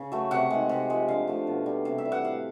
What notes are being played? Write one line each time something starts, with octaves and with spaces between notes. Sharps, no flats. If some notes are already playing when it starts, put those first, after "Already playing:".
Already playing: C#3
F#3 A3
C3 F#5
D#3 G#3
C3
F3 G#3
D3 F5
F3 A3
B2
G3
C3 F5
E5
E3 G3
F#5
A2 F5